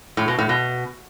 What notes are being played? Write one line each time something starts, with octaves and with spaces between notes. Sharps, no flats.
A2
B2
A2
B2